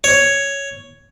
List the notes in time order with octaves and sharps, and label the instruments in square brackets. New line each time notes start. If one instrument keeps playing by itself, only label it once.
[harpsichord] C#5